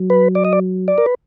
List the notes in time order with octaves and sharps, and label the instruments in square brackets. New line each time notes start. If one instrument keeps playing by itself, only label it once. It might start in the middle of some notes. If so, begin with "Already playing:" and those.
Already playing: [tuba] F#3
[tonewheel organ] B4
D5
D#5
D5
D5
A#4
B4